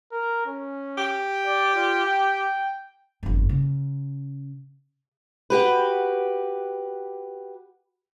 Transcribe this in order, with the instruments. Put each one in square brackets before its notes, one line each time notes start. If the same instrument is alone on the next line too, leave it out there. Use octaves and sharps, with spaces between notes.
[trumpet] A#4
C#4
[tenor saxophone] G4
[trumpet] D5
F4
G5
[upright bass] G1 F2
C#3
[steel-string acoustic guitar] F#4 G4 B4